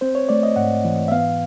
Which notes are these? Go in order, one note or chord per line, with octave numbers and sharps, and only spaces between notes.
C4 C5
C#5
A3 D5
D#5
G#2 F#5
E3
E5
B3 F5